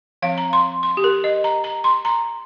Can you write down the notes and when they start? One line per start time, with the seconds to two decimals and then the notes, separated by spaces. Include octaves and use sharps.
0.22 F3 C4 F5
0.38 A#5
0.53 C6
0.83 C6
0.97 G4
1.04 A#4
1.24 D#5
1.44 A#5
1.64 A#5
1.84 C6
2.05 A#5